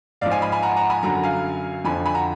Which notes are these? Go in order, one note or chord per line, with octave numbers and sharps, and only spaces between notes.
G#2 F3 D5 F5
F5 G#5
G#5 B5
G#5 B5
F#5 A#5
F#5 A#5
G#5 B5
F#2 D3 F#3 F#5 A#5
F5 G#5
F2 D3 F3 G#5 B5
G#5 B5
F#5 A#5